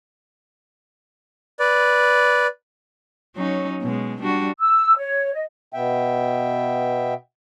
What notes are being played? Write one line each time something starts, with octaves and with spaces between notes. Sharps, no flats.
B4 D5
F#3 C#4 D#4
B2 G#3
G3 D4 F#4
E6
C#5
D#5
B2 B3 E5 G5